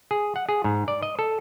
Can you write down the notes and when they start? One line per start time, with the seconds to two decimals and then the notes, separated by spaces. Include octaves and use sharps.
0.11 G#4
0.36 F#5
0.49 G#4
0.64 G#2
0.88 D5
1.03 D#5
1.19 A4